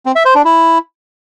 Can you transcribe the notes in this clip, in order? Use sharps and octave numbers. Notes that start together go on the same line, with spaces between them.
C4
E5
C5
D4
E4